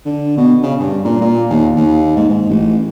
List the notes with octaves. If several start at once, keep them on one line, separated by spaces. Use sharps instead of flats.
D3
B2
C#3
G2
A#2
A#2
D#2
D#2
G#2
G#2
A1